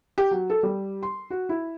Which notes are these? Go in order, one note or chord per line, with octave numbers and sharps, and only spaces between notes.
G4
F#3
A4
G3
C6
F#4
E4